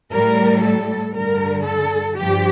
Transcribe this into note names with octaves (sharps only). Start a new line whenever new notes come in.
A2 G3 A#4
A4
G2 D3 G3 A#4
A4
G2 F3 G4